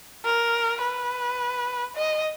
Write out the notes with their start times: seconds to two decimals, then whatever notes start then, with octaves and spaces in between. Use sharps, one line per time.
0.25 A#4
0.81 B4
1.96 D#5